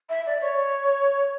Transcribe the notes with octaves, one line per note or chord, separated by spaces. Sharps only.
E5
D5
C#5